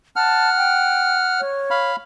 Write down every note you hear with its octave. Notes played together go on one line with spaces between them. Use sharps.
F#5 A5 F6
G5
C#5
F5 B5